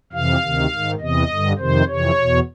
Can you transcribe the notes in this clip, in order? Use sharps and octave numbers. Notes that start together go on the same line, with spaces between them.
F2 C3 E3 F5
D2 C3 D#3
G#2 D#3
E2 C3 E3 D#5
G2 D3
F2 C3 D#3 C5
F2 C3 E3 C#5
E2 B2